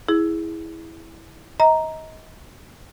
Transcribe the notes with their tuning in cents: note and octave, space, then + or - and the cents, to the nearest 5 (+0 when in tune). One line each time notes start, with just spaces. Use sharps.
E4 -10 G#4 +0
D#5 +30 A#5 +0